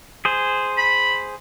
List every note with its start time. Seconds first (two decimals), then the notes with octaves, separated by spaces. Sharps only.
0.25 G#4 C5
0.77 B5